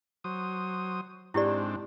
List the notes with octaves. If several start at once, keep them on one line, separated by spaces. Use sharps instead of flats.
F#3 C5 D#6
G#2 C4 D4 E4 G4 D5